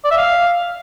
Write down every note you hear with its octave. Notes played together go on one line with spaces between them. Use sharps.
D5
E5
F5